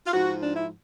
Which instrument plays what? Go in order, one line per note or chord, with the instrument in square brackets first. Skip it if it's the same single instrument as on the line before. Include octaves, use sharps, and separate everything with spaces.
[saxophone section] F4
G#2 F3 F#4
D4
E4